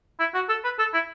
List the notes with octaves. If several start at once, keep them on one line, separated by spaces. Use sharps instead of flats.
E4
F#4
A4
B4
A4
E4